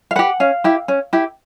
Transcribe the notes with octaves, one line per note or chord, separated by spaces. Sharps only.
F5
G4 B4 F#5
C#4 F5
E4 G4
C#4
E4 G4